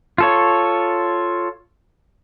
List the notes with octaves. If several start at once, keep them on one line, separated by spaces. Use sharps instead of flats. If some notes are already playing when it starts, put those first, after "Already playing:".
F4 A4 C#5